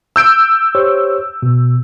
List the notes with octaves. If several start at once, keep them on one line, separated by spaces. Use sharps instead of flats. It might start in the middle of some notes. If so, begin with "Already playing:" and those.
E6 G6 D7
G4 C5 C#5
B2